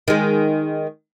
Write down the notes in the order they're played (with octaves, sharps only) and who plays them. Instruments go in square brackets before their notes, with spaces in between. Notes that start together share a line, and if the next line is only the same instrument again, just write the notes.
[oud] D#3 G#3